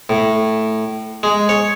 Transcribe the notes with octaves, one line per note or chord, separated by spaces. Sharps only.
A2
G#3
C#5